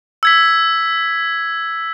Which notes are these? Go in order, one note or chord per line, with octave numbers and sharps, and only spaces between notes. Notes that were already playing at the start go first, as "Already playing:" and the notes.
E6 G#6 B6